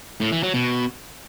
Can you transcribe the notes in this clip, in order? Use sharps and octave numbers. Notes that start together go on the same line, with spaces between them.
A2
E3
F#3
B2